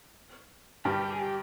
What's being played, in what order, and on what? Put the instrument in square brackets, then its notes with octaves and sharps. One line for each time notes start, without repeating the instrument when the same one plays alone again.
[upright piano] G2 G3 [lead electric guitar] G4
[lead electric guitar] G4
G#4
G4